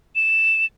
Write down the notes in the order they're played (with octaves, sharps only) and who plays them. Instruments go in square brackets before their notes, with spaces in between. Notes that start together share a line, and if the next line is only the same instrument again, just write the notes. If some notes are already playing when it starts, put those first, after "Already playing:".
[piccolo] E7